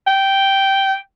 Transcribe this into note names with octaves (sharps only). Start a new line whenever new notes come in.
G5